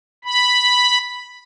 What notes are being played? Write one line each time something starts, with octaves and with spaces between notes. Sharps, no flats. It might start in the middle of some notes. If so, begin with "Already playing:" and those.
B5